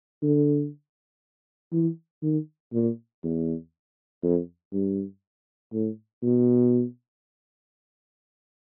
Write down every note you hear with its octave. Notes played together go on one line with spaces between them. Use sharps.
D3
E3
D#3
A#2
E2
F2
G2
A2
B2